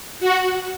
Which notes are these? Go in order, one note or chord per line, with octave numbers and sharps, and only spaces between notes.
F#4